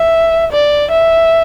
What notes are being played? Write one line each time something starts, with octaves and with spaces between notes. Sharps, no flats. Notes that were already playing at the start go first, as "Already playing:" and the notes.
Already playing: E5
D5
E5